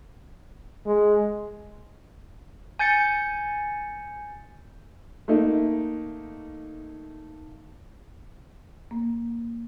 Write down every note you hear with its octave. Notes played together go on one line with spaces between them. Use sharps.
G#3
G#5 G6 A6 C#7
A3 A#3 D#4
A#3